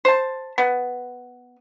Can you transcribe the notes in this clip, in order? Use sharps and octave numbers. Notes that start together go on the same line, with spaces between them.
C5 A5
B3